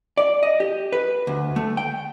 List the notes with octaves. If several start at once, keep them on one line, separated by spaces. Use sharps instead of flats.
D5
D#5
G4
B4
D2
A3
G5